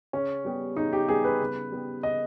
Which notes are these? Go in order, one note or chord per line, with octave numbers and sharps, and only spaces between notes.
C#3 C#4
G3 B3 G4
C#3 D#4
G4
G3 B3 G4 G#4
B4
C#3
G3 B3 G4
C#3 D#5